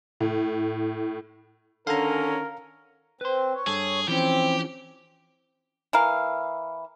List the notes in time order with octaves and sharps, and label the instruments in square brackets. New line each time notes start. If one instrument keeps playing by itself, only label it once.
[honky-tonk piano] A2
[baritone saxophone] D3 [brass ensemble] D#3 C#4 [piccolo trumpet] A#4 [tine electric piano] F5 A#5
[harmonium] C4 [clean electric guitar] B4 C6
[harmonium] C#5
[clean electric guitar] G2 A4 [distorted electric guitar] G#4
[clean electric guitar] E3 F3 C#4 [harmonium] C4 [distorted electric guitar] G4
[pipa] E3 A#4 F5